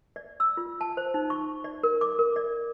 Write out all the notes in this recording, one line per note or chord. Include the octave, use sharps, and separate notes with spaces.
D5
E6
F4
A5
C5
D#4
C#6
D5
A#4
D6
A#4
D5